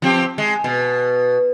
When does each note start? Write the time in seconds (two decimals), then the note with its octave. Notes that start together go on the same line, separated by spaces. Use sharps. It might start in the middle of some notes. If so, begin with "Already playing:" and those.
0.02 F3 C4 G4
0.38 G#3
0.64 B2